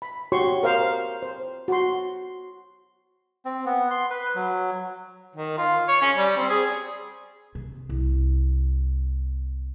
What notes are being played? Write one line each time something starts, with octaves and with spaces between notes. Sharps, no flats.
B5
F#4 G4 C#5 C6 C#6
A#4 C5 F5
C5
F#4 C6
C4
B3
C6
B4
F#3
D#3
F4
C#5
C#4
G3
C4
G#4
C3
C2